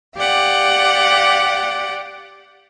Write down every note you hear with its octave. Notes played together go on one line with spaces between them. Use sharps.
G4 D5 F5 F#5